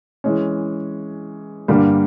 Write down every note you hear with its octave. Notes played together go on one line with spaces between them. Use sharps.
E3 G#3 C#4
G2 D3 G3 A#3